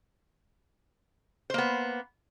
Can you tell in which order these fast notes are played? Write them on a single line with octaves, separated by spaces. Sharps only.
C5 A#3 B3